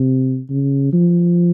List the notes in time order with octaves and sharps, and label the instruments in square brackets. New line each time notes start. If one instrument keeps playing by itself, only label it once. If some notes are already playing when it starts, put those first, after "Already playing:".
Already playing: [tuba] C3
C#3
F3